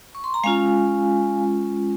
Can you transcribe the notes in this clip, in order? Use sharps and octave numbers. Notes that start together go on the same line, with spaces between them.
C#6
C6
A#5
G#3 C#4 F4 F5 G#5